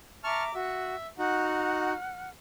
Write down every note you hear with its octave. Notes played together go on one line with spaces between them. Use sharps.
E5 A5 A#5 C#6 D6 F6
F#4 E5
D#4 F#4 F#5 F6